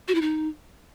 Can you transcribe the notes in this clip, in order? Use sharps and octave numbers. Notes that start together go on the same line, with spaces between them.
F#4
E4
D#4